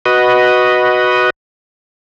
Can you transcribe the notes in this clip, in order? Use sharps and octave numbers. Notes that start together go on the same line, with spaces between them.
F#4 B4 D#5